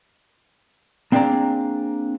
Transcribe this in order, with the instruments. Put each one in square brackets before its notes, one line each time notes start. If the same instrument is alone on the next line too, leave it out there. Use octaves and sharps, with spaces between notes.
[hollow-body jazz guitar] A#3 C4 D4 G#4 D5 A#5